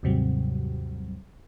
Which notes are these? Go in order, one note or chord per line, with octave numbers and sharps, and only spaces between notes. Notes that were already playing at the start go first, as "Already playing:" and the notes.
D#2 G#2 C3 F#3 G3